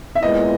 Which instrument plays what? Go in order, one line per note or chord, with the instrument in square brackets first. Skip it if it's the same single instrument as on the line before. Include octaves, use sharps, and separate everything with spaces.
[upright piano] E5
[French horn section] A#2 G#3 B3 E4 [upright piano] D#5